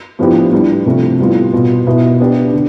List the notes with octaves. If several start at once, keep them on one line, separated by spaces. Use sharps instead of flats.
A2 F3 B3 D4 G4
A2 G3 D4
C3 F3 A3
A2 G3 B3 F4
B2 B3 F4
B2 B3 E4
B3 D4 G4
D3